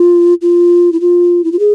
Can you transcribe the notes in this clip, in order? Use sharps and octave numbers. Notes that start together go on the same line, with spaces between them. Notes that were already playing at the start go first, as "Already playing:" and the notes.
Already playing: F4
F4
E4
F4
E4
F4
G#4